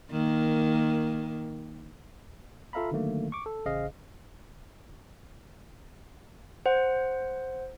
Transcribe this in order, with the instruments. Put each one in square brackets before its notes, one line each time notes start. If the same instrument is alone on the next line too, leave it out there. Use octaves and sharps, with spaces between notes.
[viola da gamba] D#3 A#3
[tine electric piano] F4 A4 E5 F5 A#5 B5
D3 D#3 F#3 A3 A#3
C#6 D6
A4
A1 C#3 G#4 C5 D#5 F5
[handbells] C5 F#5